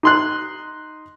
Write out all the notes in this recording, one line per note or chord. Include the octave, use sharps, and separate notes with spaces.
D#4 C6 F#6